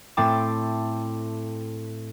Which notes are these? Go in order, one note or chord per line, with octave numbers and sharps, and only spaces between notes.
A2 A3 C4 G5 A5 D6